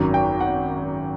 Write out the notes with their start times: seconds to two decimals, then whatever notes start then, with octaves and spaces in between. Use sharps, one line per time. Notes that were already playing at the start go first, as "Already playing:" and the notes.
Already playing: G#1 F#2 D#3 F#3 A#5
0.14 G5
0.40 F#5